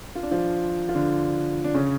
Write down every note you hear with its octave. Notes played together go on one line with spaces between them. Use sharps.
F4
D4
F3 F4
F4
D3 D4
D4
C#3 C#4